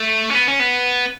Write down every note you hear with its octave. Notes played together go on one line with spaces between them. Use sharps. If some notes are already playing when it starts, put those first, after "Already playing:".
Already playing: A3
C#4
B3
C#4
B3